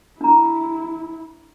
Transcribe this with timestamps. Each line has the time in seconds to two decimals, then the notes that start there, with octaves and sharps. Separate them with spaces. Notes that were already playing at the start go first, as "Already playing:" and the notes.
0.21 D4 E4 A#5